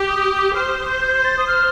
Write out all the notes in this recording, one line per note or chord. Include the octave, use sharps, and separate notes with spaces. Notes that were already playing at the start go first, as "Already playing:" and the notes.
Already playing: G4
D#6
C5 F6
G6
G6
A6
D#6
F6